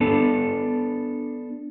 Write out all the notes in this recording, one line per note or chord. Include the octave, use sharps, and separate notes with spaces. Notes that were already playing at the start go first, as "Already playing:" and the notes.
B3 D4 A4